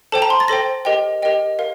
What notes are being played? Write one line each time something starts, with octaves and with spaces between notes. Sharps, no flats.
A4 C5 G5 A5
A#5
C6
A6
A4 C5 G5 A#6
G4 A#4 D#5 G5
G4 A#4 D#5 G5
A#4 F5